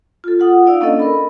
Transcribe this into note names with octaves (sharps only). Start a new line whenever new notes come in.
F4 A4
F4 F#5 D#6
D#4 D5 F5 E6
A#3 C#4 D4 A4 D#5
A#4 B5